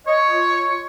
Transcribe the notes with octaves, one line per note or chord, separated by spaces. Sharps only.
C#5 D#5
F4